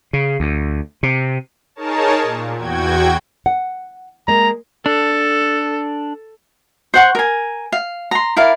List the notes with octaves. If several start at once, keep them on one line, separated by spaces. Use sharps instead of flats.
C#3
D2
C3
D#4 G#4 A#4 C#5 A5
A#2
E2 F#4 G5 G#6
F#5
G#3 A#3 A#5
D4 A4
C5 F#5 C#6
A#4 G#5
F5
A#5 C6
E4 A#4 D5 F5